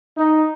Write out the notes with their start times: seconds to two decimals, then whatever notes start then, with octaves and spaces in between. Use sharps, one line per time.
0.17 D#4